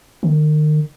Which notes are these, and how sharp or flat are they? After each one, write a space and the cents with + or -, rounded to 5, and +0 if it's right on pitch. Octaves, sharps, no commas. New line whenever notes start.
D#3 -35